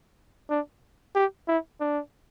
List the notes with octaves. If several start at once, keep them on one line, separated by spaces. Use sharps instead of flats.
D4
G4
E4
D4